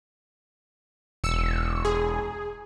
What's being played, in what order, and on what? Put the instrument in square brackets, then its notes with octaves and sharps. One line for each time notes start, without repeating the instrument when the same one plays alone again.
[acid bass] E1 [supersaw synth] E6 C#7
[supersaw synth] G#4